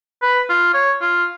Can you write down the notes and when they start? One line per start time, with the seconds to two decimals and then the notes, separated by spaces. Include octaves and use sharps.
0.22 B4
0.49 F4
0.74 C#5
1.01 F4